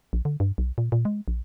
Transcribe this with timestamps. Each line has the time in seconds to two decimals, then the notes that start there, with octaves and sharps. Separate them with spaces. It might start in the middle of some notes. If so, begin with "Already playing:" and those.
0.13 A#1
0.25 D3
0.40 G2
0.58 B1
0.78 A#2
0.92 A#2
1.05 G#3
1.28 A#1